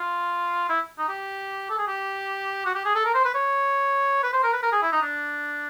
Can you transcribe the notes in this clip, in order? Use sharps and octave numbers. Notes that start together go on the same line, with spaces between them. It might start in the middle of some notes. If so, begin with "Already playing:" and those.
Already playing: F4
E4
D#4
G4
A4
G#4
G4
F#4
G4
G#4
A4
A#4
C5
B4
C#5
B4
C5
A#4
B4
A#4
G#4
E4
D#4
D4